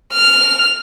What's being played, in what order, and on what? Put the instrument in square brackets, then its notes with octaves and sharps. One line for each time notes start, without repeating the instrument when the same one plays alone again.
[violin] F6